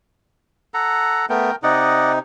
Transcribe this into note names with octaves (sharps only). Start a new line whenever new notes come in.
A4 F#5 A#5
A3 B3 A#4 G5
C3 D#4 D5 D#5 F#5